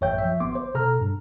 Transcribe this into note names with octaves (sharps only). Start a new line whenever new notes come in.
A1 F#2 C#5 E5 G5 G6
F3 E5
G#1 B3 C6 D6
C5
B2 A4 A#5 F6
G2